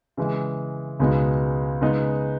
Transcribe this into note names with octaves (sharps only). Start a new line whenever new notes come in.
C#3 E3 G#3
C#2 B2 G#3 B3 D#4
C#3 G#3 B3 D#4